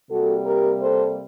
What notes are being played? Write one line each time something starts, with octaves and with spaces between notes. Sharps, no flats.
C3 G3 A#3 F#4 A4
G4 A#4
A4 C5